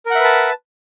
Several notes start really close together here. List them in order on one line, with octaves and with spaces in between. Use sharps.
A#4 F#5 E5 B4 A5